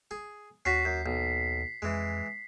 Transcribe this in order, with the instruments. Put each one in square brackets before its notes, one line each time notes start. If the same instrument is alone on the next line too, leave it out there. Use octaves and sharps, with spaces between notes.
[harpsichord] G#4
[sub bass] D#2 [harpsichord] C#4 F#4 [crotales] B6 C7
[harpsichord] F#2
B1
[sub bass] F2 [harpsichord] E3 G#3